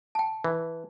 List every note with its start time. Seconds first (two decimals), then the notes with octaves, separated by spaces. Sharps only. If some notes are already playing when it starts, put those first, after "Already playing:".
0.15 G5 A5
0.44 E3